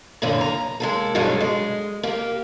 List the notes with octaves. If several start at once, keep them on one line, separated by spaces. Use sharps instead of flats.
F#2 A#2 D3 E3
A#5
G#3 A#3 A4
G2 B2 F#3 G#3 A4
G#3
A#3 G4